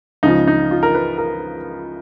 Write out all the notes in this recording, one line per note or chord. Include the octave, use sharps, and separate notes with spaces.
C#2 C#3 F3 D#4
D#4
F4
A#4
B4
A#4